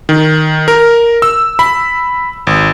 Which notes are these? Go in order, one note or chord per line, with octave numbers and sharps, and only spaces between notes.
D#3
A#4
E6
B5
G#1